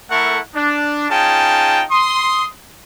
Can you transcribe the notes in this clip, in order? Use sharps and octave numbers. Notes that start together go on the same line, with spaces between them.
A3 E4 A4 A#4 F#5 C#6
D4
C#4 D#4 F4 G#4 G5 A5
C6 D#6